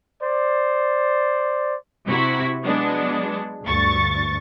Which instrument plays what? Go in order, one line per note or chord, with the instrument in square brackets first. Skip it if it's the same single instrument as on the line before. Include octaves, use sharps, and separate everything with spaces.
[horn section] C5 D5
[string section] C3 E4 F#4 B6
F#3 G#3 B3 D4
D2 G2 C#6 A6